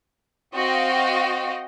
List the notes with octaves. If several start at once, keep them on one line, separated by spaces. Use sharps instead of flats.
C4 F#4 D#5 F5 G5